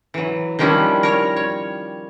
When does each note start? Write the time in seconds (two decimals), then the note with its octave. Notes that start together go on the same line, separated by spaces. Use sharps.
0.14 E3 F#3
0.59 D#3 F3 G3 C#4 D4 E4
1.03 A#4 C#5
1.37 C#5